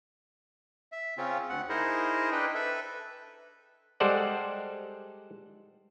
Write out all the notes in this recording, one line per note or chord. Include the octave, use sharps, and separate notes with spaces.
E5
C#3 C4 C#4 F4
D2 F#5
D#4 E4 G#4 A#4 C5 D#5
D4 B4 G5
A4 B4 E5
G3 G#3 A4 C5 D5 F#5